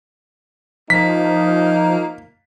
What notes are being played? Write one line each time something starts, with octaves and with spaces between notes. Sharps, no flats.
F3 A#3 D#4 B6